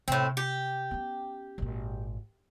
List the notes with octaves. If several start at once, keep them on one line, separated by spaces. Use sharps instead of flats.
A2 C3 B3 C4
G4
B3 C#4
G#1 A#2